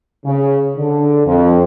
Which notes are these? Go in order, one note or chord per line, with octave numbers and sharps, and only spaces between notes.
C#3
D3
F2